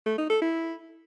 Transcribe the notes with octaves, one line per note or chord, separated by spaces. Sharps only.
A3
D#4
A4
E4